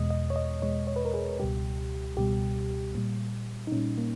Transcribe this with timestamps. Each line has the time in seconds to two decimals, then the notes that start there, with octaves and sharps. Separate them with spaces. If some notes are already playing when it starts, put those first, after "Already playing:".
Already playing: E2 B2 G#3 D#5
0.10 D#5
0.30 C#5
0.36 D#5
0.62 E2 B2 G#3 C#5
0.87 C#5
0.96 B4
1.05 A#4
1.14 G#4
1.39 C#2 B2 G3 G4
2.17 C#2 B2 G3 G4
2.95 A#2 G3
3.67 D#4
3.72 A#2 G3 C#4
3.98 A#3